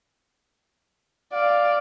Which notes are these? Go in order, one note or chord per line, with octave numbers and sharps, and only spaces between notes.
D5 F5